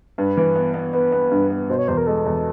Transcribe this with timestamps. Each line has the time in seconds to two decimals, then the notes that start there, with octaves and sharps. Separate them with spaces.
0.18 G2 B4
0.37 E3
0.55 B3
0.74 B3
0.93 B3 B4
1.12 B3
1.31 G2
1.50 B3
1.69 B2 C5
1.78 C#5
1.88 E2 C5
1.97 A#4
2.07 G#3 A4
2.26 E2